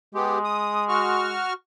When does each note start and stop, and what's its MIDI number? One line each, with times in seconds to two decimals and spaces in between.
0.15 1.44 56
0.15 0.39 59
0.15 0.39 67
0.44 0.84 87
0.89 1.53 66
0.89 1.53 85
0.89 1.53 89